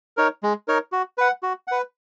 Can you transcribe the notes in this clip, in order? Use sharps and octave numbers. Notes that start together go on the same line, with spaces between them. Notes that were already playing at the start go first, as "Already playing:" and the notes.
D#4 A#4 C#5
G#3
D#4 A#4 C#5
F#4
B4 F#5
F#4
B4 F#5